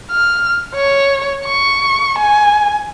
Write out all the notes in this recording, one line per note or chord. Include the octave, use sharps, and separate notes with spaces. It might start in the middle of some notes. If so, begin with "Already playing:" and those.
F6
C#5
C#6
G#5